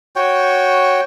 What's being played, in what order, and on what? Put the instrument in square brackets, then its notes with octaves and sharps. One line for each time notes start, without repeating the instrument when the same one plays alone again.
[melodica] F#4 C#5 G5